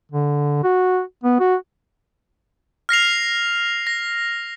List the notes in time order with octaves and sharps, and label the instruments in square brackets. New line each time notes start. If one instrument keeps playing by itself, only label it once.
[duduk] D3
F#4
B3
F#4
[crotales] F6 A#6 C7 F7
A#6